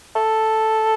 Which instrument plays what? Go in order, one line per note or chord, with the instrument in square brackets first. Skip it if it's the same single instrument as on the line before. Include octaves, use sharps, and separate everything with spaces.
[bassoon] A4